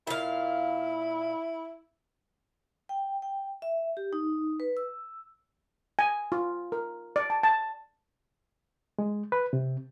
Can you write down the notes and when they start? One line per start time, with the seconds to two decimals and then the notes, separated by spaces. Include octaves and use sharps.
0.07 A#2 E4 F5
2.89 G5
3.22 G5
3.62 E5
3.97 G4
4.13 D#4
4.60 B4
4.77 E6
5.99 G#5
6.32 F4
6.72 A#4
7.16 D5
7.30 A5
7.43 A5
8.99 G#3
9.32 B4
9.53 C3